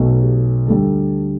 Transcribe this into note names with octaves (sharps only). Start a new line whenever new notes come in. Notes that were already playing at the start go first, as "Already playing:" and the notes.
Already playing: B1 B2 A3
G4
D2 D3 G3 A4